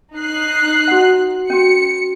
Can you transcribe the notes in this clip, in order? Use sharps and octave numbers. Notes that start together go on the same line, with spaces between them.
D#4 F#6 C7
F#4 F#5
C#4 F#4 C#7